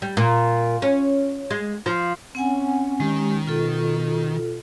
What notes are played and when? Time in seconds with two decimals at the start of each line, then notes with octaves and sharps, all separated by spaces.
0.02 G3
0.17 A#2
0.82 C#4
1.50 G#3
1.86 F3
2.35 C4 C#4 F#5 G#5
3.00 D#3 G#3 G4
3.47 B2 F4 A4